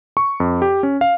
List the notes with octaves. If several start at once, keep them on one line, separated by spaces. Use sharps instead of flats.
C#6
F2
G4
C#4
F5